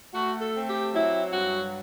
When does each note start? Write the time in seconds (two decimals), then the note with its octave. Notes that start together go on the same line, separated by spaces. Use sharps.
0.14 A3 F#4
0.41 A4
0.54 C4
0.68 G4
0.94 F#3 E4
1.33 G2 F#4